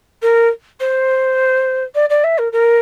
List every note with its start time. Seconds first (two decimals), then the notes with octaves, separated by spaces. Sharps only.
0.22 A#4
0.80 C5
1.94 D5
2.09 D5
2.24 E5
2.38 A#4
2.52 A#4